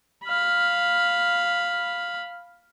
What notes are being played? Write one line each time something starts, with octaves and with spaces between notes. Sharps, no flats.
F5 B5